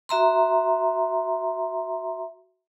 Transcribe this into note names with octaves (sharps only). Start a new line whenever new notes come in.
F#4 E5 A#5 C6